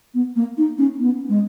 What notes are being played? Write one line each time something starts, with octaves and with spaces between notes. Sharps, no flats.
B3
A#3
D#4
C#4
B3
G#3